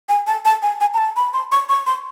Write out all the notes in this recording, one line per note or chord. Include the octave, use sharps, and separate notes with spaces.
G#5
A5
A5
G#5
G#5
A#5
A5
B5
C6
C#6
C#6
C6